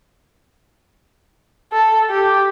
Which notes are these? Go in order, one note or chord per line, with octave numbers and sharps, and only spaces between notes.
A4
G4